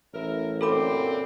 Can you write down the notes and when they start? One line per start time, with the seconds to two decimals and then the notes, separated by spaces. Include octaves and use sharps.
0.14 A1 E4 A#4
0.61 F#2 A#2 D3 C4 A4 B5 D6